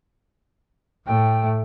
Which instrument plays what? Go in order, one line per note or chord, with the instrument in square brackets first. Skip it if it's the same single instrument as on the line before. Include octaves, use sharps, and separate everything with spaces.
[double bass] A2 A3 [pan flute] G5